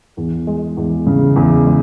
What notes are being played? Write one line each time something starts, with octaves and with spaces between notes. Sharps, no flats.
E2
G#3
E2
C#3
E2
G#3